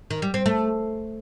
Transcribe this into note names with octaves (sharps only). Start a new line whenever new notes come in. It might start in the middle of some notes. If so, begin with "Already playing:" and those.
D#3
G3
C4
A3